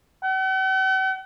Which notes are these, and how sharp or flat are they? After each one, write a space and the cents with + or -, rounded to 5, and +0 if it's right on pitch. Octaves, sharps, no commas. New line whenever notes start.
F#5 +45